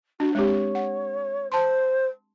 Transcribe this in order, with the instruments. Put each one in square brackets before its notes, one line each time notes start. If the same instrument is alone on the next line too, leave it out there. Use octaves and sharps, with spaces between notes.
[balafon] D4 [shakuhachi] F#4
[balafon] G#3 C4 G4 [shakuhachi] C#5
[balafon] F#5
[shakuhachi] C5 [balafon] A5 C6